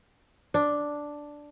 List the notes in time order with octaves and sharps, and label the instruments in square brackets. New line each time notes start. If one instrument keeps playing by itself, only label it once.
[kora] D4